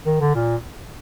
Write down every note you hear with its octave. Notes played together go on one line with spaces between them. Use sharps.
D#3
D3
A#2